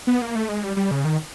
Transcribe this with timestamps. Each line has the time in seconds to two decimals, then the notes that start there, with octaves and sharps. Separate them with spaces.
0.07 B3
0.22 A#3
0.35 A3
0.49 G#3
0.63 G3
0.77 G3
0.91 C#3
1.05 D#3